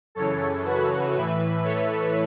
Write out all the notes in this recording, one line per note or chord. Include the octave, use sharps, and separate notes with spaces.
F#2 C#3 E3 A4 C#5
F#4 B4
A2 E3 B4 E5
A4 C#5